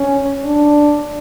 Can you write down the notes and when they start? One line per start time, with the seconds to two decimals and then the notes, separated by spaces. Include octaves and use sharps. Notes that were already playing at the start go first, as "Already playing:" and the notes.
Already playing: C#4
0.45 D4